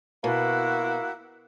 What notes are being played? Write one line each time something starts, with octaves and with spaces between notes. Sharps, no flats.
B2 A#3 E4 F#4